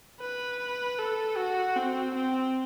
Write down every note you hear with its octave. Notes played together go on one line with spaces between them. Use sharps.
B4
A4
F#4
C4
C4